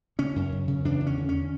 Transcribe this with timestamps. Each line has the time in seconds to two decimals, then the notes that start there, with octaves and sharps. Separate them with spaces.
0.19 C#3 C#4
0.36 F#2
0.52 F#2
0.68 C#3
0.85 E2 D4
1.01 E2
1.07 C#4
1.17 D3
1.29 C#4